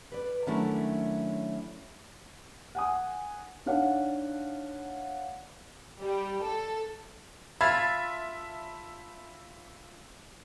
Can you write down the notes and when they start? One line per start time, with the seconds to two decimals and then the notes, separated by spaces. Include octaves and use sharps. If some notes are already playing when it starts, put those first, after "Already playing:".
0.12 B4 D5
0.47 D#3 F#3 A3 C#4 D4 E4
2.75 F#5 G#5 D#6
3.66 D4 D#4 C#5 F5 F#5
6.00 G3
6.42 A4
7.61 F4 E5 A5 B5 G#6 A6